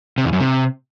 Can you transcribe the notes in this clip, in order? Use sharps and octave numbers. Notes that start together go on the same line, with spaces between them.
C3
E2
F#2
C3